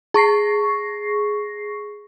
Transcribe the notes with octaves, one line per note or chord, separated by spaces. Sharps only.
G#4 C#6 A#6 C7